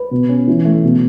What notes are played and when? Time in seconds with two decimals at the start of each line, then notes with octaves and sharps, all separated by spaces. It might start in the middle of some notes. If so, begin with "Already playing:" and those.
Already playing: B4
0.11 B2
0.29 C#4
0.48 E3
0.65 A3
0.84 B2